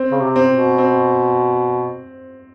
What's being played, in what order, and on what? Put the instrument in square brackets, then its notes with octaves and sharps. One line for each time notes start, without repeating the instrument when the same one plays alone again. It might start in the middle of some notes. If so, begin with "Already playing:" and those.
Already playing: [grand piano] C4
[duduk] C#3
C3
[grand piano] C4
[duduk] B2
[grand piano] C4